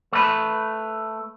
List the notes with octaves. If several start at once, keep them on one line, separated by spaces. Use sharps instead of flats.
A3 B4